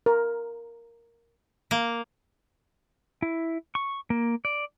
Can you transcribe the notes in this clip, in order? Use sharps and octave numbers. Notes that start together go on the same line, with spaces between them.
A#4
A#3
E4
C#6
A#3
D5